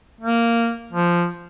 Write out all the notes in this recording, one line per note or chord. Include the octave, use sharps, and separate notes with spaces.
A#3
F3